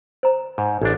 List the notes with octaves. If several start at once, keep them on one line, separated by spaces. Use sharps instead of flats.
C5 A#5
G#2
A1 D4